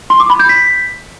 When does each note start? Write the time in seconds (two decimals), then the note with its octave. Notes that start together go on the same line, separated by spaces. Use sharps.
0.10 C6
0.20 D6
0.30 B5
0.39 G6
0.49 B6